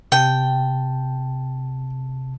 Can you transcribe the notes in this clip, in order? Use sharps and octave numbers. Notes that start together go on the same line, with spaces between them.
C3 G5 A5